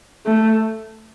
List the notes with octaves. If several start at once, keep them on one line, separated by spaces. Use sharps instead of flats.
A3